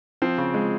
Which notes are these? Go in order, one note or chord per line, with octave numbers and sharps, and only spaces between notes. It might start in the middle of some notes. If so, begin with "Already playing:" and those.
F3 C4
C#3
G#3